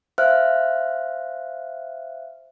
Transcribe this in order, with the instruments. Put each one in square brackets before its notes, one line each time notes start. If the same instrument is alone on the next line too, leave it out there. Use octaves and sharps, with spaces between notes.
[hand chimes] C5 E5 F5 F6 F#6